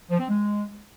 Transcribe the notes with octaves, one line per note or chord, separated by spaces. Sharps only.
F3
C4
G#3